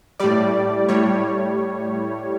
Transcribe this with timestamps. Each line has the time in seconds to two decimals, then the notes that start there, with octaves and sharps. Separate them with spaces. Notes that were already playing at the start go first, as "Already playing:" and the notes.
0.20 A2 G3 D5
0.89 A2 G3 C#5